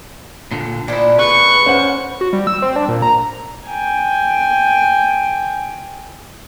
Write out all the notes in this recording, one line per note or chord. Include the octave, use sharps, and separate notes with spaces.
A#2 D3
A#2 D4 E4 C5 D#5
C#3 F3 B4 C#6
C#4 C5 F#5
F#4
G3
E6
C4
D4
A#2
A#5
G5 G#5